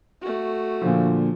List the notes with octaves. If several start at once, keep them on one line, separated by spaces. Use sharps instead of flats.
A3 F#4
A#2 D3 F3